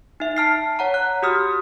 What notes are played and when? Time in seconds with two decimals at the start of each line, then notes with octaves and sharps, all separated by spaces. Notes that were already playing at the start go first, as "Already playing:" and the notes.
0.20 D#4 E5
0.36 A5 F6 C7
0.79 C#5 F#5 A#5
0.94 F#6
1.22 F#4 G4 D#6 F6